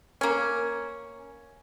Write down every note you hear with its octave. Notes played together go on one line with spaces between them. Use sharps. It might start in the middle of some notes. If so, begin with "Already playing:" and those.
A#3 C#4